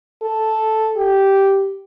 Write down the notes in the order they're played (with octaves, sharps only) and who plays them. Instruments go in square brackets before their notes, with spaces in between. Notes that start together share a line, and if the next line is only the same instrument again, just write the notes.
[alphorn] A4
G4